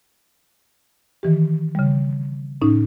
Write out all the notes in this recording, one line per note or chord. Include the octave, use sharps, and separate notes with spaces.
D#3 E3 G4
C#3 G3
A2 C#4 D#4